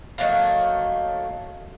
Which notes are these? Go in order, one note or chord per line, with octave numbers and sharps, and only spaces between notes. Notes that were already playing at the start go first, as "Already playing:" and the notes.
D#3 F#3 A3 A#3